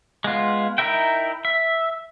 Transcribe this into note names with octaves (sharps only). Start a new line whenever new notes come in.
G#3 B3 F4
D#4 E4 A#4 E5 G5
E5